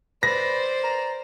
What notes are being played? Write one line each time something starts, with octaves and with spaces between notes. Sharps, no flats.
B4 C5 D5 A#6
A#5